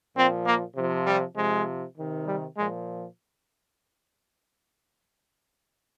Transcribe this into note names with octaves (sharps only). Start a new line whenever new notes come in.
A#2 F3 C4
A#3
C3 F3
G3
C3 F3 G#3
C3 D#3
G3
A#2 F3 G#3